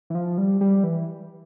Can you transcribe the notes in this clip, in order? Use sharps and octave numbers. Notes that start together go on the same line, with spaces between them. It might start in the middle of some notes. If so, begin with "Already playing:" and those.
E3
F3
G3
G3
E3